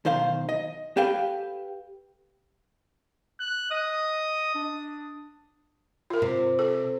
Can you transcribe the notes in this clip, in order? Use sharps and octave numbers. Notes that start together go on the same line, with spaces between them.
B1 D#3 C5 F5
D#5
G4 A4 B4 F5 G5
F#6
D#5 D#6
D4
F4 A#4
C3
A4